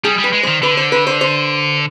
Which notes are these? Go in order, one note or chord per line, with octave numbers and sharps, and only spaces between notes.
G3 G#4
G3
B4
G#3
D#3 C5
D3 B4
C5
B4
C5
C5